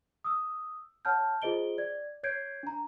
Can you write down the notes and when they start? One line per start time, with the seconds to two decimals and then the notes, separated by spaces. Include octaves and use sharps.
0.24 D#6 E6
1.05 C#5 F#5 A5 F6 G6
1.42 F4 G#4 C5 D#5 D7 G7
1.78 D5 G#6
2.24 C#5 G6 G#6 C7 D7
2.63 D4 A#5